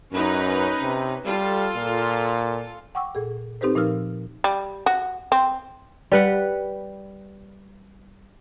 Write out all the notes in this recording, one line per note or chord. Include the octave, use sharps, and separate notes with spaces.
F#2 C#4 D#4 B4
C3
G3 F4 A4
A#2
F#5 G5 C#6 D6 E6
A#2 G#4 A4
C4 D#4 G4 A4 B4 C5
A#2 F3 D#4 A#4 E6 F6
G3
F#4
C4
G3 B4 F#5